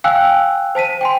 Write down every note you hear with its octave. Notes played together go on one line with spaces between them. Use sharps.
F5 G5 G#5 E6 F#6
C5 A5 B6 D#7
G5 G#5 C6